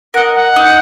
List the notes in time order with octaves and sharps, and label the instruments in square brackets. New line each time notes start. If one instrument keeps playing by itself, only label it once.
[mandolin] A#4 [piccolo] F#5
[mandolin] D#5
[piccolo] F#5
[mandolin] D#4